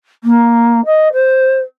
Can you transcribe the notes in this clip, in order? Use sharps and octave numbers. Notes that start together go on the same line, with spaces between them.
A#3
D#5
C5